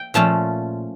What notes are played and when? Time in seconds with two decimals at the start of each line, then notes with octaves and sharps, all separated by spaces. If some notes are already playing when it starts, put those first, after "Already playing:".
Already playing: G5
0.14 A#2 F3 A3 C#4 A5